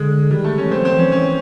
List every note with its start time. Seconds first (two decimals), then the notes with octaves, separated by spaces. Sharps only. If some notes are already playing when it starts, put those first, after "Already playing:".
Already playing: D3 G#3
0.31 D#3 G3
0.44 A3
0.58 C#4
0.67 E3
0.71 F3 C4
0.85 C4
0.92 E3
0.99 C#4
1.12 E3 C#4